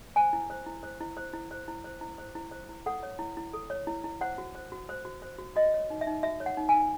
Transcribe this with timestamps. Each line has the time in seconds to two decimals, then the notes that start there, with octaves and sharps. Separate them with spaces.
0.16 C5 G#5
0.33 E4
0.50 C5
0.66 E4
0.83 C5
1.00 E4
1.17 C5
1.33 E4
1.51 C5
1.68 E4
1.84 C5
2.01 E4
2.18 C5
2.35 E4
2.51 C5
2.69 E4
2.86 A4 F#5
3.03 C#5
3.19 E4
3.37 E4
3.53 A4
3.70 C#5
3.87 E4
4.04 E4
4.21 C5 F#5
4.38 F#4
4.55 C5
4.72 F#4
4.89 C5
5.05 F#4
5.22 C5
5.38 F#4
5.56 F#4 D#5
5.73 C#5
5.90 D#4
6.01 E5
6.07 D#4
6.23 F#4 E5
6.40 C#5
6.46 F#5
6.57 D#4
6.69 G#5
6.74 D#4